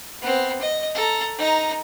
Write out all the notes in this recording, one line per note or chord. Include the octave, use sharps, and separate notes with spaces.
B3 C4
D#5
A4 A#5
D#4 A#5